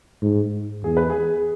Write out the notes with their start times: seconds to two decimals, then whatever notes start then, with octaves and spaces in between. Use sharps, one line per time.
0.22 G#2
0.84 E2 G#4
0.97 B4
1.10 G#4